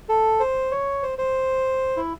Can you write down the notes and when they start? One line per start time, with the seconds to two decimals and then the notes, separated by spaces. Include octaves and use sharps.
0.09 A4
0.40 C5
0.71 C#5
1.03 C5
1.19 C5
1.97 E4